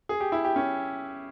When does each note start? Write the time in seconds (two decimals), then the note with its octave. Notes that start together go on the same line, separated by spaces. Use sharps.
0.09 G#4
0.21 G4
0.32 E4
0.45 G4
0.56 C#4